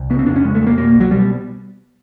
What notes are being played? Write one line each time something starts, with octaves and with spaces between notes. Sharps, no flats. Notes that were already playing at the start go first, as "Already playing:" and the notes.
Already playing: C2
C#3 B3
C4
F2 D4
C#4
C#3 G#3
A3
F2
A#3
B2 A#3
C2
F#3
B2 G3